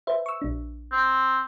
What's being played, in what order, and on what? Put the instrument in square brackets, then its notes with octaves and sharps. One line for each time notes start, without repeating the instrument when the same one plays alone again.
[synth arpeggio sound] B4 C5 E5
C#6 E6
A#1 D4
[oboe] C4